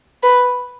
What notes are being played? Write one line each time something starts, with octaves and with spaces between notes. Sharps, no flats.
B4